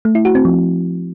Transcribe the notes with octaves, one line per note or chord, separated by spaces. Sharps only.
A3
E4
F#4
C4
F3